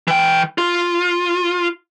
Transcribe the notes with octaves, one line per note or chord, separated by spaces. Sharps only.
E3 G5
F4